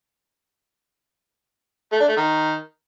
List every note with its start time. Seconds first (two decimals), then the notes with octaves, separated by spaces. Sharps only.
1.92 A3
2.00 D4
2.08 A3
2.17 D#3